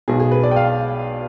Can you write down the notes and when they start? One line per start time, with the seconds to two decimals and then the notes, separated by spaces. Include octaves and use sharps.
0.08 B1 B2 G#4
0.20 G#4
0.32 B4
0.43 D5
0.51 G5
0.56 F5